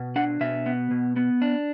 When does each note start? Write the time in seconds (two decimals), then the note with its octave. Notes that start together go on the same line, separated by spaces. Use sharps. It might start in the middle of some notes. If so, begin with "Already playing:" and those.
Already playing: B2
0.16 D4 F#5
0.41 B2 E5
0.66 B3
0.91 B2
1.16 B3
1.42 D4